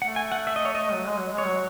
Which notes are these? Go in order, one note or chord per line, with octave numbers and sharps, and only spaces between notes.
A3 F#5
G#5
F#5
E5
D#5
C#5
D#5
F#3
G#3
F#3
G#3
C#5
F#3